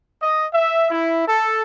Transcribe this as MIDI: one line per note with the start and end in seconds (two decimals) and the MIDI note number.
0.21 0.45 75
0.53 0.90 76
0.90 1.23 64
1.27 1.63 69